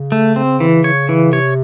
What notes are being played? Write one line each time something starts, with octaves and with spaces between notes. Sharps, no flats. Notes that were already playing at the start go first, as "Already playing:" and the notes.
Already playing: C#3
A3
C4
E3
C#5
E3
C3 C#5